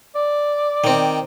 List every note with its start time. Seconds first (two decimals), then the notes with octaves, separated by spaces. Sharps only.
0.15 D5
0.84 D#3 C4